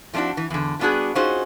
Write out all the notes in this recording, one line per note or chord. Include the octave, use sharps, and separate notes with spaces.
F3 A3 C4 D4 E4 F#4
E3
E2 D3
F#3 G3 B3 D4 F#4 G#4
C#4 D#4 F4 F#4 G#4 C5